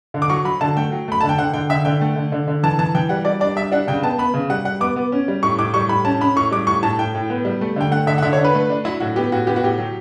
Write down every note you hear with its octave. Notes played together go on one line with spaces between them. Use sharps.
D3
D6
F#3 C#6
F#3 B5
D3 A5
A3 G5
F#3
A3 B5
D3 A5
G5
D3 F#5
D3 G5
D3 E5
D3 G5
A3
D3
D3
D3
E3 A5
E3 A5
E3 G5
G3 F#5
G3 D5
D4 D5
G3 E5
D4 F#5
C#3 G5
B3 A5
B3 B5
C#3
G3 F#5
G3 F#5
B3 D6
B3
C#4
G3
A2 C#6
A2 D6
G3 C#6
A2 B5
C#4 A5
C#4 B5
A2 C#6
G3 D6
A2 C#6
A2 A5
A2 G5
A2
B3
G3
A3
D3 G5
A3 F#5
D3 E5
F#5
D3 E5
C#5
D4
B4
A3
D4
F#3 E4
A2 F#4
B3 G4
A2 F#4
B3 G4
F#4
A2 G4
F#3